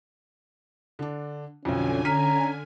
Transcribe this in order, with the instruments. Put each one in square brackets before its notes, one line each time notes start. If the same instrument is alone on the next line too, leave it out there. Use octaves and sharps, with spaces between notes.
[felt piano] D3 D4
[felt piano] B1 F2 [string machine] D3 G#5 [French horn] C#4
[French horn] C#4 [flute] A#5 [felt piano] F6 B6 D#7